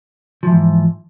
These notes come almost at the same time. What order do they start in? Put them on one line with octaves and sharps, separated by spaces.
F3 E3 G#2